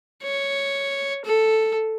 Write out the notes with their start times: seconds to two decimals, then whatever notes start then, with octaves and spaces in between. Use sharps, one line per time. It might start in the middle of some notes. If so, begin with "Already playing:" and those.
0.23 C#5
1.25 A4